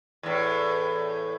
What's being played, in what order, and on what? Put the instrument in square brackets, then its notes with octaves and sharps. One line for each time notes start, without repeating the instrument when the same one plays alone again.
[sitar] E2 A2